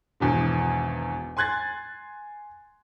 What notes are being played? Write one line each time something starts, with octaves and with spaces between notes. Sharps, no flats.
G#1 E2 B2 D3
G#5 C6 F#6 G#6 A6